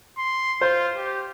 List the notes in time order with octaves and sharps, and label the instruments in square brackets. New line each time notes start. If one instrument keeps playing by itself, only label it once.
[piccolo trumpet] C6
[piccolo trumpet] F4 [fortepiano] C5
[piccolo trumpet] G4